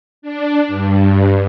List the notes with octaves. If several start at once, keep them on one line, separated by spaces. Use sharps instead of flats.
D4
G2